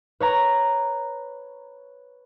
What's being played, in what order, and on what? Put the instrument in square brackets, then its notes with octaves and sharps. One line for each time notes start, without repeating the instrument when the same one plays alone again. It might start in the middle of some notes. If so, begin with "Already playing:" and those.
[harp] B4 C#5 A#5